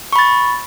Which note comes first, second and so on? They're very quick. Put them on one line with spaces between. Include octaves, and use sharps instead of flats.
C#6 B5 A6